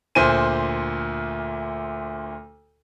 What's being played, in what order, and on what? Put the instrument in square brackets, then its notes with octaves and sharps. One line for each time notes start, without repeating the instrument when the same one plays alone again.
[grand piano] D2 A#2 C5 G#5 D#7